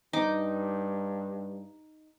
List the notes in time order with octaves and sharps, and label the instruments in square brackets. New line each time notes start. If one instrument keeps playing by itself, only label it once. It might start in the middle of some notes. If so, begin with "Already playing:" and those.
[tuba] G2 [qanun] D#4 D6